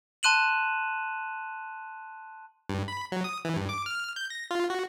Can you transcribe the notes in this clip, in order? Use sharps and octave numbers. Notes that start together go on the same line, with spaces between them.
A5 C6 F#6 D#7 E7 F#7
G2
B5
F#3
D#6
E3
G2
D6
F6
G6
A#6
F4
F#4